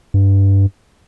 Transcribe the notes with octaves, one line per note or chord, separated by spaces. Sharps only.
G2